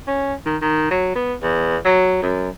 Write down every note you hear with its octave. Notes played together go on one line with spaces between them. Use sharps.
C#4
D#3
D#3
F#3
B3
E2
F#3
F#2